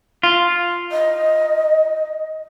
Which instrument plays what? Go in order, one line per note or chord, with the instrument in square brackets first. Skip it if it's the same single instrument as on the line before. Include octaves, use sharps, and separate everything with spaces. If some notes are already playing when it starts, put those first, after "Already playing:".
[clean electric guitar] F4
[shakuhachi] D#5